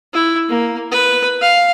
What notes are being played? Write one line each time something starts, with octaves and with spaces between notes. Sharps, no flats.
E4
A#3
B4
F5